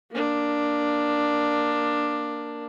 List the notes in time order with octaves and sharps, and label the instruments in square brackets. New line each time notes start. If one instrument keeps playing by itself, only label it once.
[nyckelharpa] A#3 D4